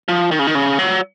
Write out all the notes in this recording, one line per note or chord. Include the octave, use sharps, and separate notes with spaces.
F3
D#3
C#3
D#3
C#3
F#3